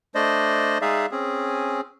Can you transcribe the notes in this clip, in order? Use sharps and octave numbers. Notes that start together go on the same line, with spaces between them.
A3 D4 C5 D5 D#5
G#3 D#4 G#4 D5 E5 F5
C4 C#4 G#4